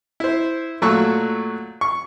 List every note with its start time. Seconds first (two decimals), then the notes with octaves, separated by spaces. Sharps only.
0.20 E4 C5
0.82 A#2 F#3 A3 C#6 E6 F#6
1.81 C#6